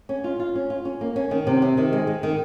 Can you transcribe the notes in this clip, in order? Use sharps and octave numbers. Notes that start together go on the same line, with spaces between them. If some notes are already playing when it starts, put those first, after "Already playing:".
C#4
F4
F4
C#4
F4
C#4
A#3
C#4
D#3
C3
C3
D#3
G#3
G#3
D#3